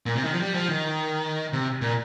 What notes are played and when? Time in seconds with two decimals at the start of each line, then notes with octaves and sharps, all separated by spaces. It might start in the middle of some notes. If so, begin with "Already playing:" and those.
0.06 A#2
0.16 C3
0.24 D#3
0.33 F3
0.41 G3
0.54 F3
0.69 D#3
1.53 C3
1.82 A#2